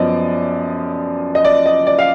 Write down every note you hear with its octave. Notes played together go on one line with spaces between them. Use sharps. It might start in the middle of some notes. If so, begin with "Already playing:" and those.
Already playing: F#2 F3 B3 D5 D#5
D#5
D5
D#5
D5
F5